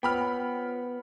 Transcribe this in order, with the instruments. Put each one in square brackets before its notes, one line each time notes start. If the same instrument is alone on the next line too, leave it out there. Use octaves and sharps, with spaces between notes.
[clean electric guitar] B3 [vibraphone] F4 C5 C#5 [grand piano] G5 B5 F6